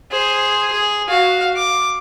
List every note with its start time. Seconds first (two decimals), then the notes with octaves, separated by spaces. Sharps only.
0.11 G#4 C5
0.72 G#4
1.09 F#4 F5
1.56 D6